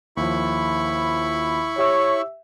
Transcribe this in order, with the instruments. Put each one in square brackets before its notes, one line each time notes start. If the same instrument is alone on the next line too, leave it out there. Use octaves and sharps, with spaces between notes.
[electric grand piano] D#2 F3 [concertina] E4 B5 C#6
[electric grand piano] G4 E5 E6 [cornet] C#5